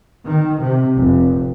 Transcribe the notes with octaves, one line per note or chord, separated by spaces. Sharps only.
D#3
C3
F1